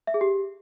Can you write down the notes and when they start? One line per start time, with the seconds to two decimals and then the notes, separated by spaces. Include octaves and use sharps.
0.07 E5
0.14 G#4
0.21 G4